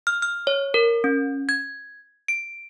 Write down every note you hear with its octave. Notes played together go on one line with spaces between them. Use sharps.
F6
F6
C#5
A#4
C#4
G#6
D7